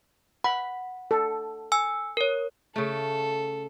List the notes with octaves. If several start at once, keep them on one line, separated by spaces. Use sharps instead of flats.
F#5 B5
A4
G#5 E6
A#4 C#5
C#3 A3 A4